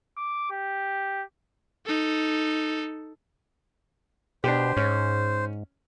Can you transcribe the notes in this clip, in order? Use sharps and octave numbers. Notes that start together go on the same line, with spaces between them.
D6
G4
D#4 A4
B2 D4 G4 C5
G#2 C#4